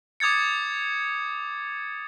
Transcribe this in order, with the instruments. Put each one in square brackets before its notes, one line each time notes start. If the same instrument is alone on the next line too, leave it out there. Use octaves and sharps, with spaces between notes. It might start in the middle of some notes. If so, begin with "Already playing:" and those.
[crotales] D6 D#6 G#6 A6 C#7